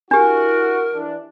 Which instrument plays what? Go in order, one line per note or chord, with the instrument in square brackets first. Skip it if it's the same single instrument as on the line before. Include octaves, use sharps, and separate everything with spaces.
[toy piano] D4 G4 [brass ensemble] E4 F#4 [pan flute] A#4
[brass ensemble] E3 D4